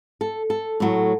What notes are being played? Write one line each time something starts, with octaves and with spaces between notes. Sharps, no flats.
A4
A4
A2 F#3 A3